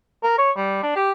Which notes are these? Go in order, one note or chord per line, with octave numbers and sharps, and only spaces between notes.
A#4
C#5
G3
D4
G4